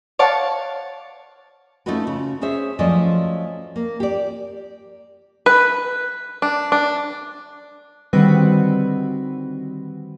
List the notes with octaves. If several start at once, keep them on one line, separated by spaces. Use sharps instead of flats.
C#5 D5 F5 F#5 A5
A3 C#4 D#4 F4 F#4 B4
C#3
C#4 G#4 C5 C#5 E5
F3 F#3 A3 C#4 D5 D#5
A#3
G4 D5
B4
D4
D4
D3 D#3 G3 C4 F#4 B4